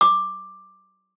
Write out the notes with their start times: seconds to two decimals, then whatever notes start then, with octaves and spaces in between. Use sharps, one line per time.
0.01 D6